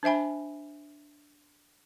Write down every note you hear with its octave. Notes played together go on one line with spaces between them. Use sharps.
D4 C5 E5 G#5 B5